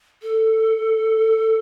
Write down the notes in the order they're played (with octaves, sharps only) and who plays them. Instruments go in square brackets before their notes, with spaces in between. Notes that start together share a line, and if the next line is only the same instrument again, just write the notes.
[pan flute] A4